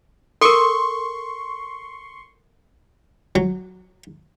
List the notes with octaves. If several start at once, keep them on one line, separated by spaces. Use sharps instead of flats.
A4 A#4 C6 C#6
F#3